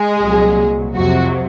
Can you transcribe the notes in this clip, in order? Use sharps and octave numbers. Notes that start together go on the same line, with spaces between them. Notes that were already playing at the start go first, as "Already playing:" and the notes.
Already playing: G#3 G#4
C2 A#2 F#3
F2 C3 F#3 F#4